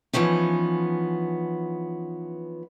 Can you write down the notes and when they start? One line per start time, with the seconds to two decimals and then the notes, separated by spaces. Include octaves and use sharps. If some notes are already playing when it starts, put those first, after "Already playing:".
0.13 E3 F3 B3 C#4 D#4